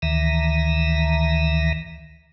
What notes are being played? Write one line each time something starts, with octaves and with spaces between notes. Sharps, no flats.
D2 D#3 E3 E5 A#5